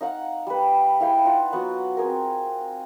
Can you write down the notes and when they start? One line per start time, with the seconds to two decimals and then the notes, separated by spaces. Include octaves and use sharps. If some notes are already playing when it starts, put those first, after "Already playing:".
0.01 D#4 F5 F#5
0.47 G3 B4
1.00 E4 G#4 F5 G5
1.25 D#4 F4 F#5 A5
1.52 F#3 B3 F#5
1.97 C4 G#4 A#4